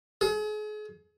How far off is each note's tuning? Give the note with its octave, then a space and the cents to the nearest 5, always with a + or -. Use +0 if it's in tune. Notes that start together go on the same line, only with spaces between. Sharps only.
G#4 +40